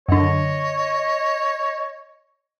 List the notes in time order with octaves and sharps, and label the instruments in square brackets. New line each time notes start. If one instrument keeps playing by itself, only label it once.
[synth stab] F#2 D3 [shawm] C#5 [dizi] D#5